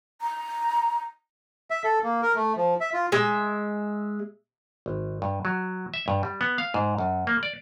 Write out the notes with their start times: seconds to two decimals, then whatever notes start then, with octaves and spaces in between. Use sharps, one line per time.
0.21 A#5
1.70 E5
1.84 A4
2.04 A#3
2.22 A#4
2.35 A3
2.56 F3
2.81 E5
2.94 F4
3.12 G#3 E5
4.86 G#1
5.22 G2
5.45 F#3
5.94 E5
6.08 G2
6.23 G3
6.41 B3
6.58 F5
6.74 G#2
6.98 F#2
7.27 A#3
7.43 D5